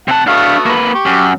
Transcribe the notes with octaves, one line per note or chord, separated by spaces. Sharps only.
C3 F#5 A5
A3 B3 D4 F#4 F5
A#3 B4
G4 C#6 D6
F#2